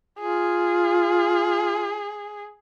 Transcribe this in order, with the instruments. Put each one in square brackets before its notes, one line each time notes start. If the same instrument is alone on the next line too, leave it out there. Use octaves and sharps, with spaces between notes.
[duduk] F4 [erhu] G#4